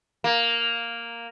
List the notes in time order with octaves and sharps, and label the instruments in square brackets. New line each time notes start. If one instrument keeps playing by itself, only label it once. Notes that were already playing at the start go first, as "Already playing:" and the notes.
[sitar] A#3